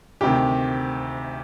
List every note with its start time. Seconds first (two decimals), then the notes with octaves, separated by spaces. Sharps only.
0.21 D2 C3 D#3 G4